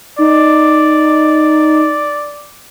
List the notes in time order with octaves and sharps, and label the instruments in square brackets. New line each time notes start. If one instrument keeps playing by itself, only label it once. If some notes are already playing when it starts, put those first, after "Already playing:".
[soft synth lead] D#4 [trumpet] D5